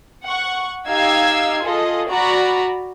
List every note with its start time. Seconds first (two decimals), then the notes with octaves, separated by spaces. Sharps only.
0.26 F#5 C#6
0.88 D#4 G4 F5 E6 G#6 C7
1.63 F4 G#4 A4 D#5
2.08 F#4 D5 A#5 B5